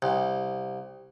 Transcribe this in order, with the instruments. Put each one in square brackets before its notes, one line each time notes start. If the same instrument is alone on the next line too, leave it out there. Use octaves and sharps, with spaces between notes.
[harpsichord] C2